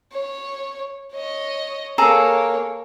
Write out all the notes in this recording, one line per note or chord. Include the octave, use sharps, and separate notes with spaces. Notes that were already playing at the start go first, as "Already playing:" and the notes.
C#5
C#5 D#5
A#3 G#4 A4 C#5 A#5